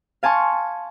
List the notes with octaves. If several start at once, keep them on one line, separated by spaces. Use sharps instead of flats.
F5 G#5 A5 C6 C#6